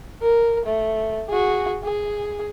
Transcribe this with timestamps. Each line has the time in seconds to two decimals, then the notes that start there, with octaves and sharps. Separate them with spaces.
0.21 A#4
0.66 A3
1.29 F#4 G#4
1.84 G#4